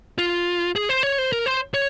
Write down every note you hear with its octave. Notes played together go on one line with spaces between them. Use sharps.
F4
G#4
C5
C#5
C5
A#4
C5
C#5